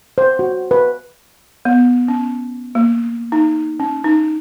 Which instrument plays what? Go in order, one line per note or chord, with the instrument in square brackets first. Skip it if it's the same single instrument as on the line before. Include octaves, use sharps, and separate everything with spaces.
[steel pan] C5
F#4
B4
[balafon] B3
C#4
A#3
D#4
C#4
D#4